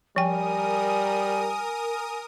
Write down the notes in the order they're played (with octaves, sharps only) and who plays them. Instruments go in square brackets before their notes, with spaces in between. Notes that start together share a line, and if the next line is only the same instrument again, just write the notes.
[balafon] F3 G5 [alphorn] G3 [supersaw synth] A#4 D#6 [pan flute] G#5